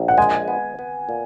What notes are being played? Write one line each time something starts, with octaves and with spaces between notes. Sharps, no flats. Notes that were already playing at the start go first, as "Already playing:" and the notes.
Already playing: A#1
F#5
G#3 G#5
B3
B3
A#2